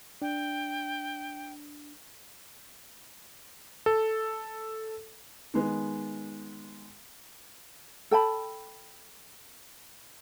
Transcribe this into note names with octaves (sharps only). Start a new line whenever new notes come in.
D4 G5
A4
D#3 G#3 B3
A4 G5 A5 B5